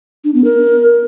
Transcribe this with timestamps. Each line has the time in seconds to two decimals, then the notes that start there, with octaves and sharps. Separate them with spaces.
0.24 D4
0.34 B3
0.44 A#4